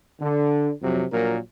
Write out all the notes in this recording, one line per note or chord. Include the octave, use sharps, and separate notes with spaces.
D3
F2 C3 F#3
A#1 A#2 F#3 A#4